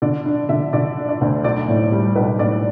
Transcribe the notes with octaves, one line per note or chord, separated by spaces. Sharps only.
D3 D5
D4
D3 E5
D3 D5
D4
D5
D2
B1 D5
A2
G3
B1 B4
A2 D5